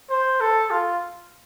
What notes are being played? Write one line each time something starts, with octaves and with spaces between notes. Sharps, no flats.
C5
A4
F4